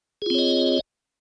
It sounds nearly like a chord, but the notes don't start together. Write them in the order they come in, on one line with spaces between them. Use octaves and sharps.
G#4 F4 C4 C#5 D#5